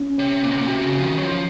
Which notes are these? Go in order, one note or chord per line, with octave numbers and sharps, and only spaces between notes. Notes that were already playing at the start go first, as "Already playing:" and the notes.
Already playing: C#4
C3 C#5
A#2 C#4
C3
A#2
C3 F#4
C#3
C#4
F3
D#3
F#3 C#5
F3